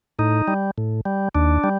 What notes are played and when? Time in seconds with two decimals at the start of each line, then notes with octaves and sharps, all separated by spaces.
0.19 A2 D#4
0.48 G3
0.78 A2
1.05 G3
1.35 D#2 D4
1.64 G3